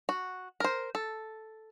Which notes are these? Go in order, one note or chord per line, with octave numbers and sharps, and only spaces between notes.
F#4
A#4 C5
A4